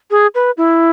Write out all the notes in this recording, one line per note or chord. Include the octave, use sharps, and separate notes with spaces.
G#4
B4
E4